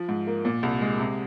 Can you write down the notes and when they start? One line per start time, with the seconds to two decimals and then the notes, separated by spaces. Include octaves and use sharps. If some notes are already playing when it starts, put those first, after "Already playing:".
Already playing: F3
0.09 G#2
0.27 A#3
0.45 A#2
0.63 C2
0.81 G#3
0.99 C3